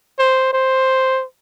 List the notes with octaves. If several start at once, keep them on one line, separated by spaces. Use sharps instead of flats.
C5
C5